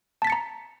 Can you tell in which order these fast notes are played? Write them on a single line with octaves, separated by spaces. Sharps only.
A5 B6 A6 C#7 A#5